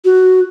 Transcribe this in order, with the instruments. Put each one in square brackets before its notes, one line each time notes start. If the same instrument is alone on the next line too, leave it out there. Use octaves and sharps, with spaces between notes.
[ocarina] F#4